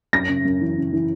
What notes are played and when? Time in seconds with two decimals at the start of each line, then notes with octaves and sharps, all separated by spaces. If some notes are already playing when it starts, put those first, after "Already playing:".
0.13 F#2 A#6
0.29 C#3
0.45 F#2
0.61 E3
0.77 C#3
0.93 E3